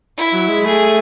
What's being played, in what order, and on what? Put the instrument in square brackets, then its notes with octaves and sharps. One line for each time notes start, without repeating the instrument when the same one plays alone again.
[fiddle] E4
[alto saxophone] F#3
G#3
[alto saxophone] A3 [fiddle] G#4